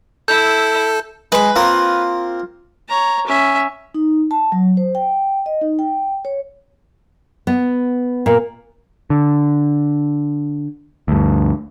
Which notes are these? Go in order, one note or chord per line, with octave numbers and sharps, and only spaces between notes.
E4 A4 G6
G#3 B4 B5
A#3 C4 F4 A#4
C#5 A#5
C#4 E5
D#4
A5
F#3
C5
G5
D#5
D#4
G5
C#5
B3
A#2
D3
D2 G2